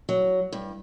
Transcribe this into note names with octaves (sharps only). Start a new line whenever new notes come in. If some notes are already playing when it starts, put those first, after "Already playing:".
F#3
G2